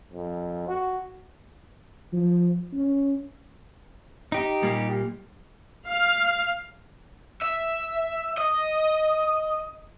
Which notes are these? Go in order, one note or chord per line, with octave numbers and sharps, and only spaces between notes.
F2
F#4
F3
C#4
D#4 G4
A#2 G3 A#3
F5
E5
D#5